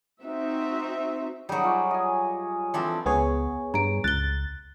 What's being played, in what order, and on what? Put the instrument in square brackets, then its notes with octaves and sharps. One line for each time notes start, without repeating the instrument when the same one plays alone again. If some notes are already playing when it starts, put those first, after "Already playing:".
[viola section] C4 D#4 F#4 E5
[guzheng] F#3 G3 [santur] D#4 G#4
[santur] F4 C#5 D5
D#5 G#5
[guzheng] E3 F3 C4 [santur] D4 A4
[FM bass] C#2 [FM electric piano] B3 G#4 C#5
[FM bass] G2 [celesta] A#5 D7
[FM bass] C#2 [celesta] F#6 G7 [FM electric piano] A6